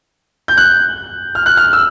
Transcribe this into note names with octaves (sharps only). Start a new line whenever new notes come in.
G6
F#6
F6
F#6
F6
E6